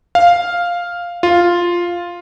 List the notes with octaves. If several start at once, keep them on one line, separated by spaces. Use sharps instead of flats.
F5
F4